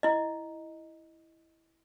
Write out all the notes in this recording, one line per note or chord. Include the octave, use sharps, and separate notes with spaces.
E4 D#5